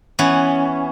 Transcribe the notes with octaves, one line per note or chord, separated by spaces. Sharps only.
E3 B3 C#4